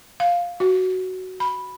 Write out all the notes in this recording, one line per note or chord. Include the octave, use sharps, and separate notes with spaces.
F5
F#4
B5